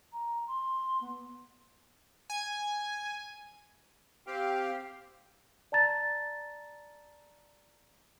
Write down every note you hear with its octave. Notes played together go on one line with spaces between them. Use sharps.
A#5
C6
B3
G#5
C4 G4 F5 G5
D5 A5 A#5 A6